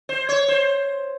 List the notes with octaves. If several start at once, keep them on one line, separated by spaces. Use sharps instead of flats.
C5
C#5
C5